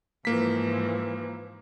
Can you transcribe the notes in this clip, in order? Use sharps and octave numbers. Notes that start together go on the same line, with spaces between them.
G#2 E3 F3 A#3 B6